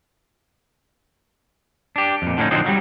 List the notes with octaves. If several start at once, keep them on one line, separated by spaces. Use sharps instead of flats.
D4 G4
F2 A#2
A2 D3 G3 B3 C#4 D#4
D3 F3 F#3 C4 D#4
F#3 G3